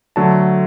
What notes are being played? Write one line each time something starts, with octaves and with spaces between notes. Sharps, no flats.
D3 F#3 A3 A5